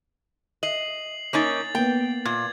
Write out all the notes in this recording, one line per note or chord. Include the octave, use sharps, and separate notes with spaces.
D#5 C7 F#7
A#3 C#4 D#4 A6 F7
A#3 B3 G5
A#2 G#6